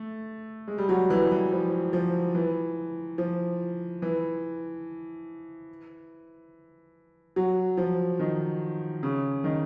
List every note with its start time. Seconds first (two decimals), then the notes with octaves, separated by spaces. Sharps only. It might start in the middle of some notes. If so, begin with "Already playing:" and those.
Already playing: A3
0.68 G#3
0.78 G3
0.89 F#3
1.10 E3
1.32 E3
1.52 F3
1.93 F3
2.35 E3
3.18 F3
4.02 E3
7.36 F#3
7.77 F3
8.19 D#3
9.03 C#3
9.44 D#3